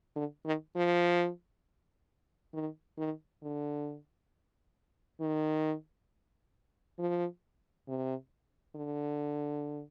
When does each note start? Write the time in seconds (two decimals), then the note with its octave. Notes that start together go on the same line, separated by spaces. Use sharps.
0.16 D3
0.45 D#3
0.75 F3
2.53 D#3
2.97 D#3
3.42 D3
5.20 D#3
6.99 F3
7.88 C3
8.76 D3